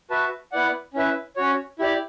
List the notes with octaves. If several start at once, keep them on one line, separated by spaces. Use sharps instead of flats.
F#4 B4 E5 A5
B3 E4 B4 D5 F#5
C#4 E4 B4 E5
C#4 F#4 C#5
E4 G4 D5